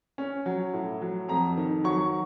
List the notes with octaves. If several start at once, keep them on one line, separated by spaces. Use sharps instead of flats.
C#4
F#3
A2
F#3
F2 A#5
D#3
F#3 C#6